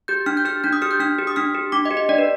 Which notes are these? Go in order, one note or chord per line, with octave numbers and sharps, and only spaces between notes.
G4 G6
D4 F6
G6
G4 F6
D4 G6
D#6
G4 F6
G6
D4 F6
G4
D#6
D4 F6
G4
D4 D6
D#5
G4
D#5
D4 D5
B4